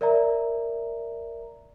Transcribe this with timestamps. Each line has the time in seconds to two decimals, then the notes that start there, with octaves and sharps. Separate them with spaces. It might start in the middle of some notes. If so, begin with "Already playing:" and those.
0.01 A#4 D5 E5 A#5